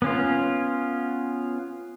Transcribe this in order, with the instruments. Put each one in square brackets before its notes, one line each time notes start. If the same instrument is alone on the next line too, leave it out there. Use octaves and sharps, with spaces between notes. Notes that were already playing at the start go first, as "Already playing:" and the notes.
[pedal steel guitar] B3 C#4 F4